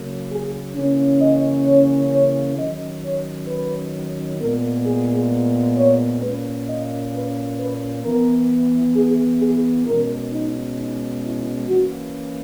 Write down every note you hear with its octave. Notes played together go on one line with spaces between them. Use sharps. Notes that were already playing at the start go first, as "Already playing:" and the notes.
Already playing: C#3 F#3 A#3
G#4
C#3 E3 A#3 C#4
D#5
C#5
C#5
D#3 F#3 C#4 D#5
C#5
B4
A#2 G#3 B3 A#4
G#4
C#5
A#2 A#3 C#4 B4
D#5
B4
B4
E3 B3 A#4
G#4
G#4
B2 G#3 C#4 A#4
D#4
D#4
E4
E3 A#3 C#4 F#4